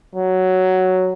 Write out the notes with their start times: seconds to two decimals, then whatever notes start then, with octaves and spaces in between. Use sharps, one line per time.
0.15 F#3